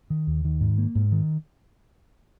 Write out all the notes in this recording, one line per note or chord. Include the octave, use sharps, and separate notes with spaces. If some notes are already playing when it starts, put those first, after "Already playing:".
D#3
D#2
D#3
G#2
A#3
G#2
D#3